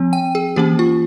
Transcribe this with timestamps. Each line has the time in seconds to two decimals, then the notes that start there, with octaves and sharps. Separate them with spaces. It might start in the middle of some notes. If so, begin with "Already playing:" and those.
Already playing: F3 C4
0.13 G5
0.35 G#4
0.56 E3 A#3 C#4 G4
0.79 F4